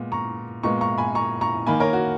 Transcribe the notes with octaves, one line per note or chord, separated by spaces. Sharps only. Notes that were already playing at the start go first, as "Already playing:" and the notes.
Already playing: A#2 G#3 B3
A#5 C#6
A#2 G#3 B3 A#5 C#6
A#5 C#6
G#5 B5
A#5 C#6
A#5 C#6
D#3 A#3 G#5 B5
A#4 C#5
F#4